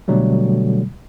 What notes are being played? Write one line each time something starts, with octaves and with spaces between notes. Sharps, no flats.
B2 D3 F#3 G3 A3